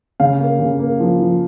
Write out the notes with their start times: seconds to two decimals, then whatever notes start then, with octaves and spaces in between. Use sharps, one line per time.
0.20 C#3 F5
0.40 A#3
0.59 C#3
0.79 A#3
1.00 F3
1.19 F3